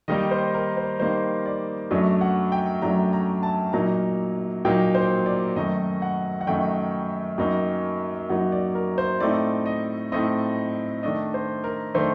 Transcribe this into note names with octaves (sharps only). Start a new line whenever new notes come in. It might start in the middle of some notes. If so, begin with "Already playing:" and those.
D#3 G3 A#3 D#4 D#5
C5
A#4
C5
D#3 G3 A#3 D#4 C5
D5
F#2 F#3 A3 D4 D#5
F#5
G5
F#2 F#3 A3 D4 A#5
A#5
A5
A#2 F#3 A#3 D#4 A#5
A#2 F#3 A#3 D#4 G5
C5
D5
F#2 D#3 A3 D#4 D#5
F#5
F#5
F#2 D#3 A3 D#4 G5
F#2 F#3 A#3 D#4
F#2 F#3 A#3 D#4 F#5
D5
A#4
C5
A2 A3 C4 D#4 D5
D#5
A2 A3 C4 D#4 D#5
D#3 A3 D4 D#5
C5
A#4
D#3 A3 D4 C5